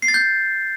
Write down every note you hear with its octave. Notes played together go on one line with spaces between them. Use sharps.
C7
A6
G6